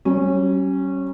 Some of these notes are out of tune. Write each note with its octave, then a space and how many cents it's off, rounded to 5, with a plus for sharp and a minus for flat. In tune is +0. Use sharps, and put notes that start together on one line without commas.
G3 -45 C#4 -15